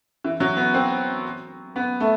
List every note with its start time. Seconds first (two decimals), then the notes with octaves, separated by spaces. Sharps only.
0.24 E3
0.40 F#3
0.57 B3
0.74 C4
1.76 B3
2.00 A3